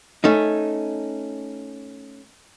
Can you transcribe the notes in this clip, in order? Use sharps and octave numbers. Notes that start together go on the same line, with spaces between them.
A3 C#4 D#4